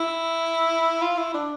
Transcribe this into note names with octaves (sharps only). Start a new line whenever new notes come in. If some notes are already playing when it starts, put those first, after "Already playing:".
Already playing: E4
F4
E4
D4